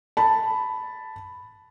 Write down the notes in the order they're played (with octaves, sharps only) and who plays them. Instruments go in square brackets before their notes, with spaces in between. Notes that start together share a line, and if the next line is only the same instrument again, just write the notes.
[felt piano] A5 B5